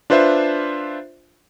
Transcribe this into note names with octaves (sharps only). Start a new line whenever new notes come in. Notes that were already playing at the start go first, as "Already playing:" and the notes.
D4 F4 B4 C5 E5